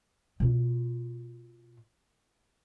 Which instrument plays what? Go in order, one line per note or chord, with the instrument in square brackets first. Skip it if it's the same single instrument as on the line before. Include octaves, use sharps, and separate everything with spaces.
[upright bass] B2 F4